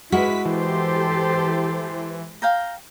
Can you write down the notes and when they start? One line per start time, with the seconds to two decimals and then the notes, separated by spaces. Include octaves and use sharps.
0.12 G#3 E4 F#4 A#4 B4 B6
0.45 E3 G4 A4 C5
2.42 F5 G5 A#5